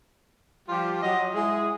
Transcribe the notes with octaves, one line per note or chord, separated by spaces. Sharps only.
F3 G3 F4 G4
F#3 D#5
G#3 E4 G#4